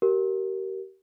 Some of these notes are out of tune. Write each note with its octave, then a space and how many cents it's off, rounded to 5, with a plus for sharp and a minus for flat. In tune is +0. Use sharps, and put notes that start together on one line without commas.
G4 -30 A#4 +0